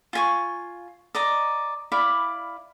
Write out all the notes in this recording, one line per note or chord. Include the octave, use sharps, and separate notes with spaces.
F4 G#5 C#6
D5 D#5 A#5
E4 D5 F5 B5